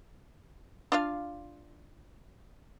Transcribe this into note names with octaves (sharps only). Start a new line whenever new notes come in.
D4 F4 F5